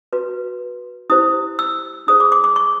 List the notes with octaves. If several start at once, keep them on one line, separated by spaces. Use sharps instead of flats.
F#4 B4
E4 G4 C5 D#6
E6
D#4 G#4 C5 D#6
D6
D6
D6
C#6